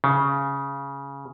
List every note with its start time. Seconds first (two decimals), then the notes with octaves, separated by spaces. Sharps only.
0.04 C#3